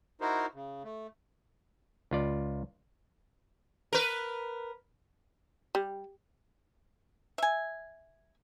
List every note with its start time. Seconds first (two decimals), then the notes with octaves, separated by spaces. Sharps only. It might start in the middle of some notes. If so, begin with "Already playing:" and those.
0.21 D#4 E4 F#4 A#4 C5
0.54 C#3
0.84 A3
2.11 C#2 F4 D5
3.93 A#4 B4
5.75 G3
7.38 E5 G#5